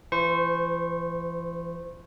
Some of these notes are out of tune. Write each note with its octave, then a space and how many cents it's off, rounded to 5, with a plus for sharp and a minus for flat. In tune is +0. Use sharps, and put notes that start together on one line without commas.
E3 +40 C5 -25 C#6 -30